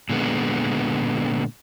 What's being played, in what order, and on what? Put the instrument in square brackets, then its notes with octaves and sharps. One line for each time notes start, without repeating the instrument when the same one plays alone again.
[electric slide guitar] A#2 D3 G#3 A3 B3